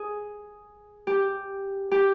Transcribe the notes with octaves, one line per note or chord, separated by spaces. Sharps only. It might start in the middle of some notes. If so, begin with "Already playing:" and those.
Already playing: G#4
G4
G4